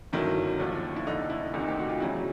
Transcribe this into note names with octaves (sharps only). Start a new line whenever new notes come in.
G1 F#2 D#3 F#3 E4
D#2 D3 F3
E4
F1 D#2 D3 D#4
E4
D2 C3 D#3 D#4
G4
F#4
F4
E2 C#3 F#3 E4